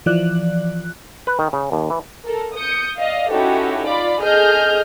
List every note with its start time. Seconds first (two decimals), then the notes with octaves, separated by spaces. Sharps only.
0.06 E3 F3 D5 F#6
1.27 B4
1.39 D#3
1.53 C#3
1.72 D#2
1.90 E3
2.25 A4 A#4
2.54 D#6 G6 C#7
2.97 D5 D#5 F5
3.30 C#4 D#4 E4 F#4 G4 A4
3.87 F4 D5 B5 D6
4.19 G#4 A4 D#5 F6 G6